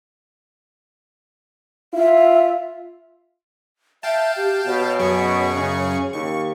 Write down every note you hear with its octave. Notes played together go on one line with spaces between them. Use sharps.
F4 E5
E5 F5 G5 A5
G4
B2 C#5
F#2 G#4 C#6
C#3
D#2 C#6